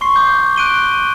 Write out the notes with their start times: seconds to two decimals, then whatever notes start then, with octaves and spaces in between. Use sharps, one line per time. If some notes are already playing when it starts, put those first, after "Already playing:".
0.01 C6 C#6 C7
0.16 D6 G6
0.56 F#6 D7 D#7 G7